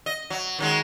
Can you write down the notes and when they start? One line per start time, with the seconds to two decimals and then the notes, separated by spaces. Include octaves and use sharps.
0.06 D#5
0.30 F#3
0.59 D#3 F#3 G#3